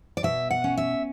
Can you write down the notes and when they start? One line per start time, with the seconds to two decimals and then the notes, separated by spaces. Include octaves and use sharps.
0.17 D5
0.23 B2 E5
0.51 F#5
0.64 C#4
0.78 E5